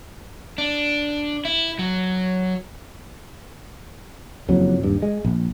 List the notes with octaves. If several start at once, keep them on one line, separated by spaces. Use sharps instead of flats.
D4
E4
F#3
F#1 F2 F#3
D#1 G2
G#3
A#1